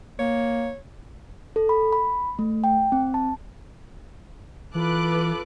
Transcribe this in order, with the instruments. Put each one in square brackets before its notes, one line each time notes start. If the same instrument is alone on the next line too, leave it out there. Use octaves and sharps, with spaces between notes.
[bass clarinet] A#3 [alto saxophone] C#5
[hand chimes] A4
B5
B5
A3
G5
C4
A5
[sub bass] E3 [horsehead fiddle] F4 A4 [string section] B4 D6 F#6